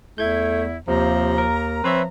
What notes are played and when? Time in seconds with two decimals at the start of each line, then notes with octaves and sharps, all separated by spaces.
0.18 E2 A3 E4 G6 G#6
0.88 D#2 C3 F3 A#5
1.38 A#4
1.84 F3 C4 B4 C#5 E5